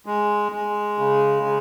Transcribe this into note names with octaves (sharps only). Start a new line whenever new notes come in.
G#3
G#3
C#3
C#3